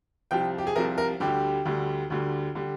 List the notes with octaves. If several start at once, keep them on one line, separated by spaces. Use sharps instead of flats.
C2 C3 F3 G5
G4
G#4
C2 C3 F3 A#4
A#4
D2 D3 G3 G4
D2 D3 G3
D2 D3 G3
D3 G3